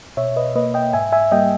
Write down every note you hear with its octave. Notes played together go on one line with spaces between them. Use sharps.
B2 C#5 E5
B4 D#5
A#3 B4 D#5
D#5 G5
G#2 E5 G#5
E5 G#5
G3 A#3 D#5 G5